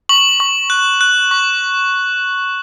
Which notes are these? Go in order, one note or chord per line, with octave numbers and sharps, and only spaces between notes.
C#6 F#7
C#6
F#6
F#6
C#6